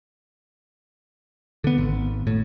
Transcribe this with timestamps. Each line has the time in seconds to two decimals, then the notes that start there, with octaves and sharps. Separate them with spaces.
1.64 D3 B3
1.78 G#1
2.27 A2